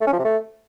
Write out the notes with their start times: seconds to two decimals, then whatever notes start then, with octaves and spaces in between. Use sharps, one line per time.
0.01 A3
0.07 C#4
0.13 F3
0.19 C3
0.25 A3